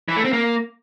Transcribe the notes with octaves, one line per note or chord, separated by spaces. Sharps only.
E3
A3
C4
A#3